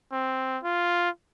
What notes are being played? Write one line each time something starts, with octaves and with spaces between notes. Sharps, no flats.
C4
F4